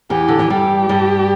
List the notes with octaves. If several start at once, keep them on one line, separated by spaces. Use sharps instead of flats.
E2 E3 G4
D3
E3
G2 G3 G4
G2 G3